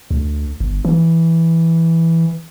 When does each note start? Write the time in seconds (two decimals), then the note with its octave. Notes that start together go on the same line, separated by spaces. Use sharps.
0.11 D2
0.60 G1
0.85 E3